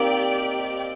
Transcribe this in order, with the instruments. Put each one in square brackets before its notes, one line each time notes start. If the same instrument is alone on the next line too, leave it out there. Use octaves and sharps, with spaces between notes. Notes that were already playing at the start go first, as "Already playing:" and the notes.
Already playing: [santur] A#3 C4 D#4 [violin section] G4 D5 G5